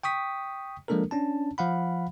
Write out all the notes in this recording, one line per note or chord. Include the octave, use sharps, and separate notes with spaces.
G5 C#6 D#6 B6
F3 G#3 A#3 D4 A4 A#4
C#4 D4 A5
F3 F5 F#5 B5